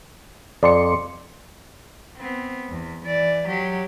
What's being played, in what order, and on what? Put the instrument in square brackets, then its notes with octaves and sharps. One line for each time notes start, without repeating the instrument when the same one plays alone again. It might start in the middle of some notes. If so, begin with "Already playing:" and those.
[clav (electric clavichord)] F2 [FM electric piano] D5 C6 C#7
[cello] B3 C4
E2
E3 D5
F#3 G4